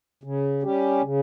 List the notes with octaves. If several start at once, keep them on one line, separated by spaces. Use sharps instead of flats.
C#3
G3 C#4 G4
C#3